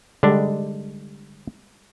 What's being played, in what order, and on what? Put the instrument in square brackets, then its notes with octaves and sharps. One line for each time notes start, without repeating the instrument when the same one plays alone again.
[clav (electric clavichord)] D3 D4 [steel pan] G3 G#3